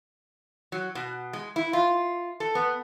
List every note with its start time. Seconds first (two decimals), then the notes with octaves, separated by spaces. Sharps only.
0.72 F#3
0.95 B2
1.33 G#3
1.56 E4
1.73 F4
2.40 A4
2.55 B3